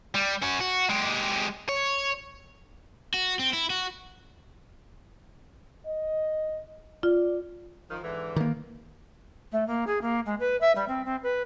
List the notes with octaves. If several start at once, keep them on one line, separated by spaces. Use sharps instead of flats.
G3
C#4 F#4
F#4
G#3 G4
C#5
F#4
C4
E4
F#4
D#5
F4 D5
D#3 F3
G#2 D3 E3
D#3 A#3
A3
A#3
G#4
A#3
G#3
B4
E5
G3
C4
C4
B4